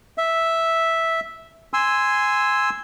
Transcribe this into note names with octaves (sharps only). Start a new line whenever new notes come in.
E5
G#5 C6 E6